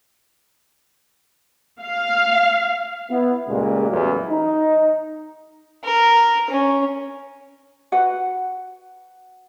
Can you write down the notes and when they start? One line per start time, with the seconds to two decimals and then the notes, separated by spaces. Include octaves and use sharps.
1.82 F5
3.11 B3 E4
3.48 C#2 A#2 G3 G#3
3.89 A1 E2 F#3
4.30 D#4
5.84 A#4
6.50 C#4
7.92 F#4 B4 F#5